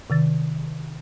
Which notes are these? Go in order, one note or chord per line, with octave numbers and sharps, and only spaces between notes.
C3 D#3 A6